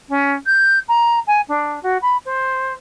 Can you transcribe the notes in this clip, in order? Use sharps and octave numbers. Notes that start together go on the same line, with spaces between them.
C#4
G6
A#5
G#5
D4
F#4
B5
C5